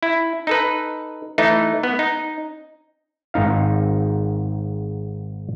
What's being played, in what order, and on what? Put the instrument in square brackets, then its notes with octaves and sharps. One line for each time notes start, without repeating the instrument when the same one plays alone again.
[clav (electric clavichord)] E4
D#4 A4 B4
E3 A3 D#4
B3
D#4
G#1 G#2 C4 D#4 F5